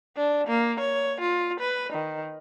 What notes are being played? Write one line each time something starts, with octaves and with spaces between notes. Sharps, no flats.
D4
A#3
C#5
F4
B4
D#3